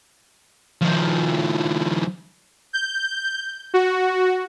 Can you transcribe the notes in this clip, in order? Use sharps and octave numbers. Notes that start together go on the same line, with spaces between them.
D#3 F3
G6
F#4